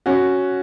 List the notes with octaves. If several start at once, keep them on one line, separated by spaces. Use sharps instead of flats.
C#4 F#4